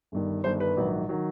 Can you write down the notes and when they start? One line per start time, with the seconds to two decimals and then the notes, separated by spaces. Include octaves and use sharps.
0.12 G1 G2 D#3
0.44 G1 G2 D#3 C5
0.60 B4
0.77 A#1 G#2 D#3 F#3
1.09 D#3 F#3